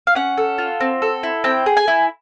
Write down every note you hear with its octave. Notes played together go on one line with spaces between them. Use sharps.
F5
C#4 F#5
A4
F4
C4
A4
E4
C4 G5
G#4
G#5
E4